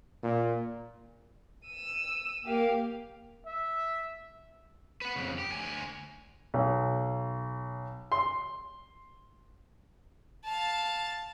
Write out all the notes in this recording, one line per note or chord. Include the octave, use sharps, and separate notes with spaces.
A#2
E6 D#7
A#3 G4 F5
E5
B4 F#5
F2 C#3
G4
D2 G#5
B1
C6
F5 A5